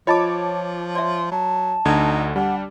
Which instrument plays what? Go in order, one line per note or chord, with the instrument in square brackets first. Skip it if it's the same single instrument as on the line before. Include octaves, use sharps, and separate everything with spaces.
[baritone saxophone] F3 [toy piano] F4 D#5 [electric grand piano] C#5 A5 D6
[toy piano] D5 E5 [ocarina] C6
[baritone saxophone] F#3 [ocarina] A5
[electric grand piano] D2 D3 G#6 [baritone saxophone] D#4
[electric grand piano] G3 [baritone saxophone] D4 [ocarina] F#5